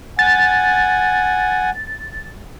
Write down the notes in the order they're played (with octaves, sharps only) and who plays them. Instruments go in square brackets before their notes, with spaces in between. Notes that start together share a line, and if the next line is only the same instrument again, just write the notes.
[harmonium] F#5 G#5 [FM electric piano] A6